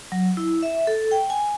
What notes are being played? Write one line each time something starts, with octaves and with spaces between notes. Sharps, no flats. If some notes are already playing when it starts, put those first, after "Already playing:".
F#3
E4
E5
A4
G5
G#5